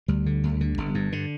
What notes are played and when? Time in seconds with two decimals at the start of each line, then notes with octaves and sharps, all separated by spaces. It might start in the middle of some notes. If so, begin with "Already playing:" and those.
0.08 D2 G3
0.26 D3
0.44 D2
0.61 D3
0.78 G1
0.95 G2
1.12 D3